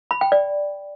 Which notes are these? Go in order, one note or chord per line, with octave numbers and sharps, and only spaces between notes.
B5
G5
D5